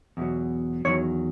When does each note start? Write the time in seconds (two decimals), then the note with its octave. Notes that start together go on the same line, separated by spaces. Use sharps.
0.17 E2 B2 F#3
0.85 E2 D#3 F#3 C#5